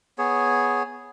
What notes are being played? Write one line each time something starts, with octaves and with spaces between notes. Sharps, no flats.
B3 G#4 C#5